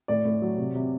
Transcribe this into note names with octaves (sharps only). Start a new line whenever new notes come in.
A2 D5
A2
F#3
C3
C3